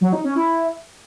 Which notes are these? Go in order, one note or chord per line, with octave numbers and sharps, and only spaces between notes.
F#3
D#4
C#4
E4